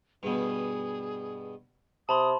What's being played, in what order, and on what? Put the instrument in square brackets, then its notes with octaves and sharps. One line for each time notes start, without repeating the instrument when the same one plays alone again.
[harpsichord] G2 B2 [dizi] G#4
[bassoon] C3 [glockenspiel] A5 B5 C6 [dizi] D#6